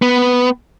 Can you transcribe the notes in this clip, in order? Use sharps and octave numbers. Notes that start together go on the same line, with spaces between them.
B3